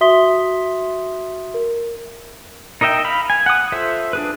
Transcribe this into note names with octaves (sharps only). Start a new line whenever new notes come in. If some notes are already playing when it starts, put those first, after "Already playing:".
F#4 E5 C6 D#6 B6 G7
A#4
D#4 A#4 D#5 E5 G5
F5 B5
G#5
F#5 D#6
F4 A4 C5 E5
D4 G#4 B4